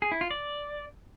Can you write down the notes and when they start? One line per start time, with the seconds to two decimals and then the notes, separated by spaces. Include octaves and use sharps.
0.02 G#4
0.12 E4
0.21 F4
0.31 D5